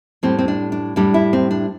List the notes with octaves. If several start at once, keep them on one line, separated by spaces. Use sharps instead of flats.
A2 G3 C4
C4
D4
D4
A2 G3 D4
E4
C4
D4